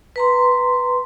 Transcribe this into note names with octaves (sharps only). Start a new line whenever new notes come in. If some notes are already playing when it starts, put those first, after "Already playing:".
B4 A#5 C6